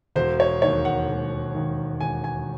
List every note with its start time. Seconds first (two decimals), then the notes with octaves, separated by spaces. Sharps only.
0.16 E1 C5
0.40 C#5
0.62 D#2 D#3 C#5
0.85 F#5
1.09 E1
1.55 D#2 D#3
2.01 E1 G#5
2.24 G#5